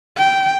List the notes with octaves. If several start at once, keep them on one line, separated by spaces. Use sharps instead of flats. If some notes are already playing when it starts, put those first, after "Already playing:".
G5